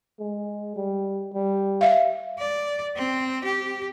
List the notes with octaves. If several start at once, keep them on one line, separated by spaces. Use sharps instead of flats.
G#3
G3
G3
E5 F5
D5
C4
G4